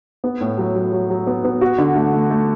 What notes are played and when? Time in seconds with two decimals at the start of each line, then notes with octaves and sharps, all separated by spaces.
0.24 B3
0.41 A2
0.58 F#3
0.75 F#3
0.93 F#3
1.10 F#3
1.27 B3
1.44 B3
1.61 F#4
1.78 D3
1.96 A3
2.13 A3
2.30 A3